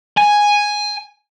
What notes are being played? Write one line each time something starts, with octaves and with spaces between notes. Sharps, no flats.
G#5